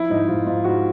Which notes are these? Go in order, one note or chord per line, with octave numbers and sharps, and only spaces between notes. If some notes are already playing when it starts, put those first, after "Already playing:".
Already playing: F3 E4
G#2 D#4
G#2 F4
G#2 F4
G#2 F#4